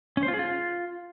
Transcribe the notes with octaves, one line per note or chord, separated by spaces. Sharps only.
C#4
C5
F4
G#4
F4